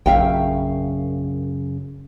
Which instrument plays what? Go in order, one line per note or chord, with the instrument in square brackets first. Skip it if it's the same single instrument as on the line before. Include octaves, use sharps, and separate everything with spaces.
[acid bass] A#1 [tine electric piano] F#2 C#3 [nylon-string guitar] E5 F5 G5